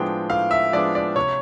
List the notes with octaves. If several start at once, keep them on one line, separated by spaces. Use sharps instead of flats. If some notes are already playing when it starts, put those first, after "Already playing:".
Already playing: A2 F3 G#3 B3 D4 G5
A2 F5
E5
F3 G#3 B3 D4 D5
D5
C3 C#5